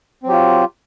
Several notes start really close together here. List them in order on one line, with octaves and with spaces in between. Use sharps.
C4 F#3 G4 F4